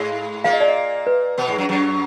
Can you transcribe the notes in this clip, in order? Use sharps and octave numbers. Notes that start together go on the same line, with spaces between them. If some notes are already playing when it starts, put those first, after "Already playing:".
Already playing: G#2 G#3 F5
A#2 A#3 F5
D#5
D5
D#5
B4
B2 B3
G#2 G#3
F#2 F#3
F#2 F#3